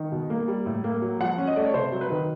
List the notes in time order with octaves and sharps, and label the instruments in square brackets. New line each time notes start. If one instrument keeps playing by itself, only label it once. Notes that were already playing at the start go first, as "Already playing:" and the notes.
Already playing: [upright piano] D#3
B2
A#3
G3
A2
A#3
F#3
F3 F#5
C#4
D#5
A3 D5
C#5
C3 C5
F#3
B4
D#3